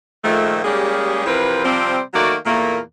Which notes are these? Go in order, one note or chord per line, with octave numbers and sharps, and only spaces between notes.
A#2 D#3 F3 G#3 A3
G3 G#3 A#3 C#4 G4 G#4
C3 E3 F3 C4 A#4 B4
C3 F3 G3 C4
D#3 F#3 A3 A#3 F#4 D5
E2 A#2 A3 A#3